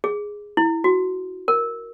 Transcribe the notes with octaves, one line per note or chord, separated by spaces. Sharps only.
G#4
E4
F#4
A#4